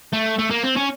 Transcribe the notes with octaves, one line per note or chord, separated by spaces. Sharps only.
A3
A3
A#3
C4
C#4